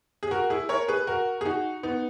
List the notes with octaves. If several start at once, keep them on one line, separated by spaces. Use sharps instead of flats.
G#4
F#4 A#4
E4 G#4
A#4 C#5
G#4 B4
F#4 A#4
G#4
D#4 F#4
B3 D#4